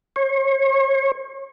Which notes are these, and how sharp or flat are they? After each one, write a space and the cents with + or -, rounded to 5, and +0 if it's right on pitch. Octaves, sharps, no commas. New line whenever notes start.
C#5 -40